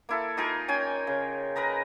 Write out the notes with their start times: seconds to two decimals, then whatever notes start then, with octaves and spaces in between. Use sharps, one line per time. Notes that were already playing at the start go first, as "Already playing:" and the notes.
0.09 A#3 E4 A4
0.37 D#4 F4 G#4 A#4
0.68 C#4 G5 G#5
1.07 C#3
1.56 A#4 B4 D#5 A#5